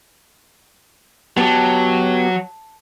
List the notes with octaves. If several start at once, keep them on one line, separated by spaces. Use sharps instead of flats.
F#3 B3 G4 A5